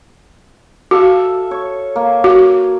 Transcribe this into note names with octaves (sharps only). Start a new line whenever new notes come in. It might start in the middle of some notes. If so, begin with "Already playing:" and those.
F#4 A4 E5 F5
C#5
A#3
F#4